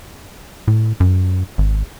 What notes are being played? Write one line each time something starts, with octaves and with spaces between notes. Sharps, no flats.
A2
F#2
G#1